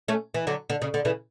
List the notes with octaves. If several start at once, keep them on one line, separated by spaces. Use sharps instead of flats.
A3 C#4
E3
D3 F#3
D3
C#3
D3
C#3 E3